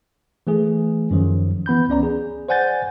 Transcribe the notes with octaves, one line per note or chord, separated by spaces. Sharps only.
E3 A3 G#4
F#2 D#3 F3 F#3
E3 B3 B5 G6
C#2 C#4 D5 A#5
G#4
C5 D5 F#5 G#5 G6 A6